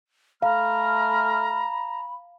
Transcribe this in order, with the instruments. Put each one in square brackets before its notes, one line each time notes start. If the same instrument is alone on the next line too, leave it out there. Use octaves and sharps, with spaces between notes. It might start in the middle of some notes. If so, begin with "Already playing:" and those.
[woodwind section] A3 F6 [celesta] F5 [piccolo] A#5 [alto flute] B5